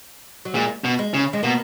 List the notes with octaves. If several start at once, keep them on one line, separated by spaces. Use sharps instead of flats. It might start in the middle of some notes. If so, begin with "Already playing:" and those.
F#3
A#2 G#3
B2
G#3
C#3
G#3
B2 A#3